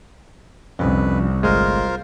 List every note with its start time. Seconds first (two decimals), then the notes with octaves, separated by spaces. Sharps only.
0.79 C2 F2 F3 C#4 D4 B4
1.43 G1 G#3 A3 F4 A#4 C5